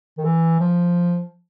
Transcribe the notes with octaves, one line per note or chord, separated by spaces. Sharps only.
D#3
E3
F3